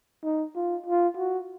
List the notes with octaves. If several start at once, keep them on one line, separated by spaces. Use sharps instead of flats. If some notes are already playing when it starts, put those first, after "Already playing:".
D#4
F4
F4
F#4